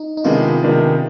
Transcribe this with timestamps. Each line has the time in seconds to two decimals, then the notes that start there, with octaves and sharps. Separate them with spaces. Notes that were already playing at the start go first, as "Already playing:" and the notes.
Already playing: D#4
0.17 D#4
0.24 C3 D#3 G#3 B3 D4 F4
0.63 C3 D#3 G#3 B3 D4